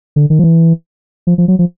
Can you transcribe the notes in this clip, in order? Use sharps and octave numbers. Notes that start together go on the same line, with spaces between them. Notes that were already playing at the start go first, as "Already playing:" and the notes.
D3
D#3
F3
E3
F3
F3
F#3
F3